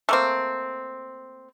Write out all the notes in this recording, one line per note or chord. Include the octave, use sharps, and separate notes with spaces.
A3 A#3 C4